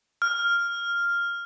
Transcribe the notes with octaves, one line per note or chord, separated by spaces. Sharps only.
F6